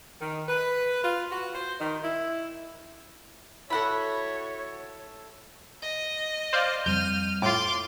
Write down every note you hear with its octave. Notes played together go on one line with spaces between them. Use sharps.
D#3
B4
F4
F#4
C5
D#3
E4
E4 F#4 A4 C#5 F#5 B5
D#5
C5 D5 F5
F2 G3 F6 G6 D#7
A2 F4 C6 D6